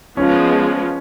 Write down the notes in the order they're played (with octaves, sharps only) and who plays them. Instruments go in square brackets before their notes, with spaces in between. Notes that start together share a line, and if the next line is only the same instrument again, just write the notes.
[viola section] F3 G#3 B3 [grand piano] C#4